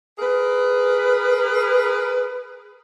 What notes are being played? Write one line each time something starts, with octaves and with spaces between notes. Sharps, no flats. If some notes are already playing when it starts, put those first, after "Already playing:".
G#4 A#4 B4